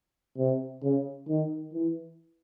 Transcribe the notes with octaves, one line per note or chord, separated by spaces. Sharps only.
C3
C#3
D#3
E3